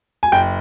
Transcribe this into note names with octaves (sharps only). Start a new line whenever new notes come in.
G#5
F#1 G5